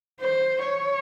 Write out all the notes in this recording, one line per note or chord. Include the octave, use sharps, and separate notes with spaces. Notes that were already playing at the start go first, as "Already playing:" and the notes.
C5
C#5